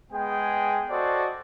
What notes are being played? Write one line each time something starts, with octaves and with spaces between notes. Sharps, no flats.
G#3 B3 G#4 G5
F#4 A4 C5 D5 D#5